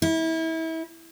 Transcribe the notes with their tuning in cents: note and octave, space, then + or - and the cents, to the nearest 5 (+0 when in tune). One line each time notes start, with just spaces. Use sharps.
E4 -30